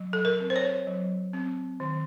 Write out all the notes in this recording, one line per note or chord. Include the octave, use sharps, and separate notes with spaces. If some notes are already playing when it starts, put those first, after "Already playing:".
Already playing: F#3
A4
A#4
C4
C5
C#5
F#3
C4
D#3